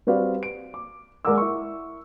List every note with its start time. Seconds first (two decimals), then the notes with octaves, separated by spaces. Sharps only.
0.07 G3 C4 F#4 B4 D5 F5
0.43 D7
0.74 D6
1.25 G#3 A#4 D5 F#5 D6 E6
1.38 E4 A#4 C#6